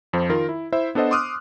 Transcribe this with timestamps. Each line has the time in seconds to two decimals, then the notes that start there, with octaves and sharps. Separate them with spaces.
0.13 F2 F3 C5
0.29 D#3 F4 A#4
0.49 E4
0.72 E4 C5 E5
0.95 B3 D4 A4 C5 D#5 F#5
1.11 C6 D6 D#6 F6 F#6